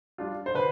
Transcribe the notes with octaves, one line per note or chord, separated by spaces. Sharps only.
G3 D4 F4
C5
D3 B4